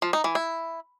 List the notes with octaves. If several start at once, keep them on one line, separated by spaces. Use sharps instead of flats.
F3
D#4
E3
E4